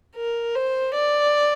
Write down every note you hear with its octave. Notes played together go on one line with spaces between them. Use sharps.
A#4
C5
D5